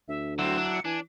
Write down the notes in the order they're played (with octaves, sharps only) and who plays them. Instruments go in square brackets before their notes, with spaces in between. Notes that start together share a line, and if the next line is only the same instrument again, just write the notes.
[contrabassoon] D2 [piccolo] E5
[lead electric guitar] D3 C4 [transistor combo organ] F#3 E4 [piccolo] E7
[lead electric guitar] D4
[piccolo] C#7
[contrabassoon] E3 [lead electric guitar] D4 [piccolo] G#5